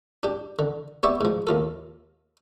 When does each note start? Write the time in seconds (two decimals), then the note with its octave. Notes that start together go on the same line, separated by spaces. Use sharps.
0.23 D4 G4
0.59 D3
1.03 B3 G4 C#5 D5 E5
1.21 G#2 F3
1.47 D#2 F4 A4